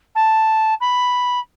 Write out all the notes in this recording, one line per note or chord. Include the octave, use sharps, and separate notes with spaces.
A5
B5